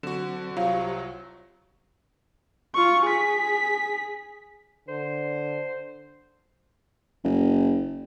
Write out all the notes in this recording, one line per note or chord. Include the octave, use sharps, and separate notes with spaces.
D3 F#3 C4 F#4 E7
C2 F#3 F4 G4 C5 F5 C#6
F4 C#6
G#4 B6
D3 C5
F#1